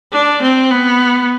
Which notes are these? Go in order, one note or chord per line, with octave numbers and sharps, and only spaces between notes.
D4
C4
B3